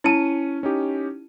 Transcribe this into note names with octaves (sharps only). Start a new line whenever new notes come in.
C#4 E4 A5 C#7 D#7
C#4 D#4 G4